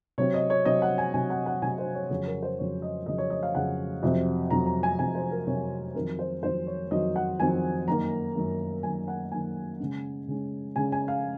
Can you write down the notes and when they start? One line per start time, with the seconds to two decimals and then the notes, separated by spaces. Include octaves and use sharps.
0.18 C3 F#3 C4 C#5
0.34 D#5
0.50 C#5
0.65 C3 F#3 C4 D#5
0.82 F#5
0.98 G#5
1.14 C3 F#3 C4 G#5
1.30 F#5
1.46 F#5
1.62 C3 F#3 C4 G#5
1.78 C5
1.95 C#5
2.10 F2 C#3 F#3 C#5
2.26 A#4
2.43 C5
2.58 F2 C#3 F#3 C#5
2.82 D#5
3.06 F2 C#3 F#3 D#5
3.18 C#5
3.30 D#5
3.43 F5
3.55 F2 C#3 F#3 F#5
4.03 F2 C3 F#3 C4
4.50 F2 C3 F#3 C4 A#5
4.67 A#5
4.83 G#5
4.99 F2 C3 F#3 C4 G#5
5.15 C5
5.31 A#4
5.47 F2 C3 F#3 C4 C#5
5.95 F2 D#3 F#3 C4 A#4
6.19 C5
6.43 F2 D#3 F#3 C4 C5
6.67 C#5
6.91 F2 D#3 F#3 C4 D#5
7.16 F#5
7.39 F2 D#3 F#3 C4 G#5
7.88 F#2 D#3 A#3 A#5
8.36 F#2 D#3 A#3
8.83 F#2 D#3 A#3 G#5
9.08 F#5
9.32 F#2 D#3 A#3 G#5
9.80 C#3 G#3 C#4
10.28 C#3 G#3 C#4
10.76 C#3 G#3 C#4 G#5
10.92 G#5
11.08 F5